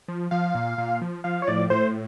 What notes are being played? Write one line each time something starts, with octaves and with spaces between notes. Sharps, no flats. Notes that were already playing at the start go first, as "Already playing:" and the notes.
F3
F3 F5
A#2
A#2
F3
F3 F5
C#5
A2 D5
A2 C5